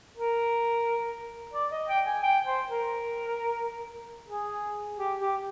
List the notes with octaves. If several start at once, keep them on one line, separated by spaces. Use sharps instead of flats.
A#4
D5
D#5
G5
G#5
G5
C5
A#4
G#4
G4
G4